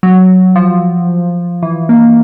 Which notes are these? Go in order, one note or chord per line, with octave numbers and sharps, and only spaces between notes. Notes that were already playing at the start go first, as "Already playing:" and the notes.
F#3
F3
E3
A#3